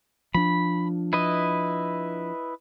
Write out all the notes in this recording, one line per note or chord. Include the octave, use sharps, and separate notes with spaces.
F3 D4 B5
E4 B4 D#5